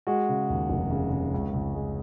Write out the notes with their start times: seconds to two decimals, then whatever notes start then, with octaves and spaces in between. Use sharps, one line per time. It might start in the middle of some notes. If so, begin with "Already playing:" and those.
0.07 G#3 F#4
0.29 C#3
0.50 D#2
0.70 F1
0.91 C#3
1.12 C#3
1.34 C#2
1.54 C#2
1.75 G#3